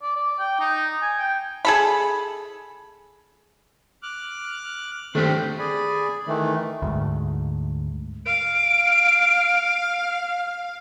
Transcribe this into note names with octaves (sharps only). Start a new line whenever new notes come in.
D5
D5
G5
D#4
G#5
G5
G#4 A4 B5
D6 F6 F#6
D#3 A3 C4 D4 G4
G#4 D5 G#5 B5
D#3 E3 A3
D2 G#2
F5 D7